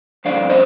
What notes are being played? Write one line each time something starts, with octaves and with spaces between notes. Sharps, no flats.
G2 D3 F3 D5 F5
C5 D#5